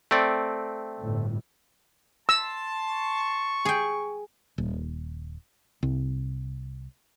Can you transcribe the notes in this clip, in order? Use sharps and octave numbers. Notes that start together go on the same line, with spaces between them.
A3 C4 D5
G1 A2
A5 C6 E6
C#6
G#4 G5
D#1
C2